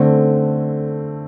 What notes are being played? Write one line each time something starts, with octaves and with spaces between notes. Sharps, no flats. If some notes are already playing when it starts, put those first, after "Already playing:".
Already playing: D3 A3 C4